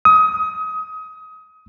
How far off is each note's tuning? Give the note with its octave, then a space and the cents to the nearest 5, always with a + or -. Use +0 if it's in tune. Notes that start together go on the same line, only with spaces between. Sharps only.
D#6 +25